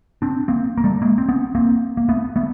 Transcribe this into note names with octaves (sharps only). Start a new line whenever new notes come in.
C4 D4
A#3 C4
A#3
G3 A3
G#3 A#3
C4
B3 C#4
A#3 C4
A#3
A3 B3
A3 B3